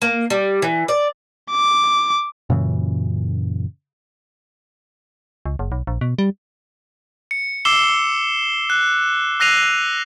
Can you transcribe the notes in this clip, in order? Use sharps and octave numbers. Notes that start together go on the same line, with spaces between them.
A#3
G3
E3
D5
D6
F#2 A#2 C#3 E3
C#2
F#1
B1
A#1
B2
G3
C#7
D6 E6 C7 E7 G7
F#6
E6 F#6 A#6 C7 D#7 F7